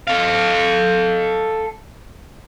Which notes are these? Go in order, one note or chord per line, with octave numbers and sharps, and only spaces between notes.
A4 F5